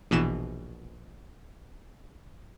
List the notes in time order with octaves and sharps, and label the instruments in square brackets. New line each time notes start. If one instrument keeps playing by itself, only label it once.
[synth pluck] A#1 B2 E3 E7